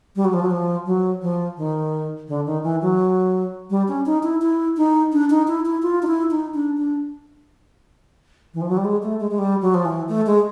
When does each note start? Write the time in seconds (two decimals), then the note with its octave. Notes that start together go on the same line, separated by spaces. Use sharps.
0.16 G3
0.25 F#3
0.33 F3
0.42 F#3
0.51 F3
0.86 F#3
1.22 F3
1.57 D#3
2.28 D3
2.46 D#3
2.63 E3
2.82 F#3
3.70 G3
3.88 C#4
4.06 D#4
4.23 E4
4.42 E4
4.77 D#4
5.12 D4
5.30 D#4
5.48 E4
5.66 E4
5.83 F4
6.03 D#4
6.07 E4
6.31 D#4
6.54 D4
6.77 D4
8.54 E3
8.61 F3
8.69 F#3
8.77 G3
8.84 G#3
9.03 A3
9.20 G#3
9.31 G#3
9.38 G3
9.62 F#3
9.74 F3
9.85 E3
10.08 A3
10.26 G#3